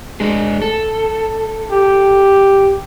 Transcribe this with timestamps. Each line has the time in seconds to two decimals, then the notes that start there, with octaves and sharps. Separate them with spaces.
0.20 G#3 D4 G#4
0.62 A4
1.71 G4